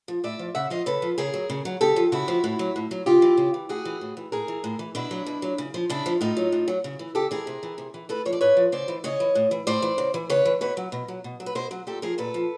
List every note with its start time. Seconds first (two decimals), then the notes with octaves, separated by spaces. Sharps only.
0.08 F3
0.24 A2 D5 E5
0.39 F3
0.55 C#3 E5 F#5
0.70 F3 D#5 F5
0.86 C#3 A4 B4
1.02 F3
1.18 C#3 G#4 A#4
1.34 F#3
1.50 C#3
1.65 F#3
1.81 C#3 G4 A4
1.96 F3
2.12 C#3 E4 F#4
2.28 F3
2.44 A2
2.59 F#3
2.76 A2
2.91 F#3
3.06 C#3 F4 G4
3.22 E3
3.37 C#3
3.54 E3
3.69 A2 F#4 G#4
3.85 E3
4.01 A2
4.17 E3
4.32 A2 G#4 A#4
4.48 E3
4.64 A2
4.79 E3
4.95 B2 D4 E4
5.11 F#3
5.26 B2
5.42 F#3
5.58 C#3
5.74 F3
5.90 C#3 D4 E4
6.06 F3
6.21 A2 D#4 F4
6.37 F#3
6.52 A2
6.68 F#3
6.84 C#3
6.99 E3
7.15 C#3 G4 A4
7.31 E3 G#4 A#4
7.47 C3
7.63 E3
7.78 C3
7.94 E3
8.09 A2 A4 B4
8.25 F3 C#5
8.32 D5
8.41 A2 B4 C#5
8.57 F3
8.72 C#3 C5 D5
8.88 E3
9.04 C#3 C#5 D#5
9.20 E3
9.35 A2
9.51 E3
9.67 A2 C5 D5
9.82 E3
9.98 C#3
10.14 E3
10.30 C#3 B4 C#5
10.45 E3
10.61 B2 B4 C#5
10.77 F#3
10.92 B2
11.08 F#3
11.24 B2
11.40 F#3
11.46 B4
11.55 B2 A#4 C5
11.71 F#3
11.87 A#2 G4 A4
12.02 F3 G#4 A#4
12.18 A#2 A4 B4
12.34 F3